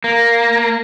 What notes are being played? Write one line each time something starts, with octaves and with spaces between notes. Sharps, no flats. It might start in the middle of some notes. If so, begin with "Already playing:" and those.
A#3